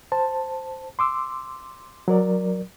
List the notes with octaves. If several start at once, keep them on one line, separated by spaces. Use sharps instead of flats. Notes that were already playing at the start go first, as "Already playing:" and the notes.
C5 A5
C6 D6 E6
F#3 A#4 D5